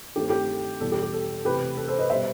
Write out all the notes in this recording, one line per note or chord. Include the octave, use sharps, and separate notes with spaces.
G2 D#3 A3 C4 G4
G4
E2 B2 G3 A4
G4
G4
A4
C3 E3 A3 G4 B4
A4
A4 C5
B4 D#5
B2 G3 B3 C5 E5